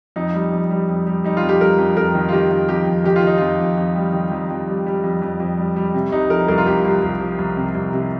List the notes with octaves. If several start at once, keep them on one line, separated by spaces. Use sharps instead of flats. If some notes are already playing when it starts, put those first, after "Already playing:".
F2 D#4
G3
F2
G3
F2
G3
G3 D#4
F4
F2
G4
G3 A#4
F2
F2 A#4
D#3
F4
D#3 G4
D#3
F2 G4
F2
D#3 G4
F4
D#3 D#4
F2 F4
F2
F2
G3
D#3
F2
F2
G3
G3
F2
F2
F2
G3
G3
C3
C2 D#4
F3 A#4
C2 A#4
F4
C2 G4
C2
C2
F3
C2
C3
C2
C3